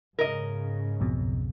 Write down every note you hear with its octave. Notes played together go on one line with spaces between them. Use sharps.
G#2 C#3 A#4 D#5
B1 F2 B2